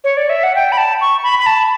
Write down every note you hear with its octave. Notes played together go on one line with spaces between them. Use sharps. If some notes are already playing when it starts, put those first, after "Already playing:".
C#5
D5
E5
F#5
G5
B5
A5
C#6
B5
B5
A5